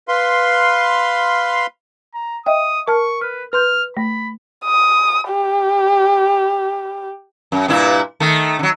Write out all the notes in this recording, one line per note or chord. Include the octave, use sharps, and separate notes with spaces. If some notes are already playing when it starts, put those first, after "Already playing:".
B4 F5 C6
A#5
D#5 E5 G5 D#6
A#4 A5 C#6 F6
B4 F6
B4 C6 F6 G6
A3 B5
D#6
G4
F#2
G2 A#2 E4
D#3 A3
D3 F#3